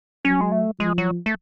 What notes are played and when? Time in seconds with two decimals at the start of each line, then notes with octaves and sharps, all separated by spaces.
0.25 F#3 C#4
0.41 G#3
0.52 A3
0.79 F3 G#3
0.98 F#3
1.26 A3